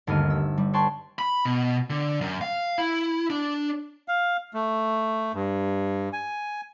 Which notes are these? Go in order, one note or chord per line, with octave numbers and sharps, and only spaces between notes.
G1 D#2 A3 F6 D#7
E6
G3
B4 C#5 G5 A5 C6 C#6
B5
B2
D3
F#2
F5
E4
D4
F5
A3
G2
G#5